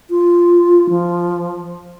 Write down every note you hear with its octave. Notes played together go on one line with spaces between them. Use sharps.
F4
F3